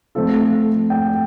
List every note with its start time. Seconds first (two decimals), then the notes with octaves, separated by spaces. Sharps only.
0.15 F3 A3 C4 F4 A4
0.90 G5